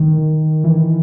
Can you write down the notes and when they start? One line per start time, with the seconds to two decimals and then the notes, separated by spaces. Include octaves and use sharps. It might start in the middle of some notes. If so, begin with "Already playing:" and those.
Already playing: D#3
0.64 E3